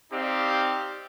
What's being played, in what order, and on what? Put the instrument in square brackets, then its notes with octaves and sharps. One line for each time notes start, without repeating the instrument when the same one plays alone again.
[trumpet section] C4 D#4 G4 D5 F5